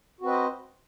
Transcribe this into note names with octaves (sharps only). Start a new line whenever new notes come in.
C4 F#4 B4 C5 D#5